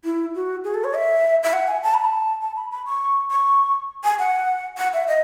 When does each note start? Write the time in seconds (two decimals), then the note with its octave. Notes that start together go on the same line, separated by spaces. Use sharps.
0.05 E4
0.35 F#4
0.64 G#4
0.74 A4
0.84 C#5
0.94 E5
1.43 E5
1.53 F#5
1.67 G#5
1.83 A5
1.94 B5
2.05 A5
2.42 A5
2.56 B5
2.71 B5
2.86 C#6
3.31 C#6
4.04 G#5
4.19 F#5
4.78 F#5
4.93 E5
5.08 D#5